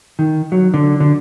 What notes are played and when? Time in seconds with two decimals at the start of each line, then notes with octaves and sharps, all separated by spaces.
0.19 D#3
0.52 F#3
0.74 D3
1.00 D3